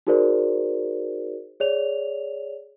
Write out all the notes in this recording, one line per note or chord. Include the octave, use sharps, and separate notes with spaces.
D#4 F#4 G#4 A#4 C5 D5
G#4 C#5 D5 F7